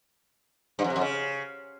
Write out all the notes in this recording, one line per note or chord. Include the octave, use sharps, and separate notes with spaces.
G2
F2
C3
F2
C#3